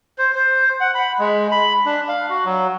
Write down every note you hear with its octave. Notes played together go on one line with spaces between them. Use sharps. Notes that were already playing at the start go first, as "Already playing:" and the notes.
C5
C5
F#5
B5
G#3
B5
D4
F5
F#4
F#3